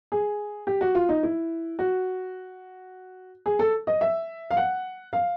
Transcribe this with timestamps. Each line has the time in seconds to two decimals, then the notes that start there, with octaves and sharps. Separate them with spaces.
0.12 G#4
0.67 G4
0.81 F#4
0.95 F4
1.09 D#4
1.23 E4
1.79 F#4
3.46 G#4
3.59 A4
3.87 D#5
4.01 E5
4.51 F5
4.57 F#5
5.13 F5